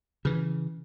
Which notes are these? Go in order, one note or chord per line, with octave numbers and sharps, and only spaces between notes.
C#3 E3